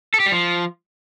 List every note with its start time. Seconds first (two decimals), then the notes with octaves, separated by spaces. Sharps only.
0.14 A4
0.20 G4
0.26 G3
0.32 F3